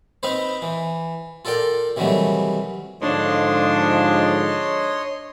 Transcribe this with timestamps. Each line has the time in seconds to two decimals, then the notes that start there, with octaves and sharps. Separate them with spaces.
0.23 C4 D#4 B4 C5
0.62 E3
1.45 F4 A4 A#4 D5 G5
1.96 C3 D#3 E3 F#3 G3 A3
3.02 G#2 D3 F3 D4 C#5 D#5 C6